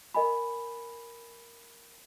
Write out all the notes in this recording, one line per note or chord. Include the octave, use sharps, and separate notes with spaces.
A#4 D#5 G#5 B5